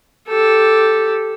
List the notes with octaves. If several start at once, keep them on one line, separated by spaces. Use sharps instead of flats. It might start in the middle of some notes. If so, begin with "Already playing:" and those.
G4 A4